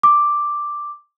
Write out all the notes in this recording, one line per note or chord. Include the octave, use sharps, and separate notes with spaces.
D6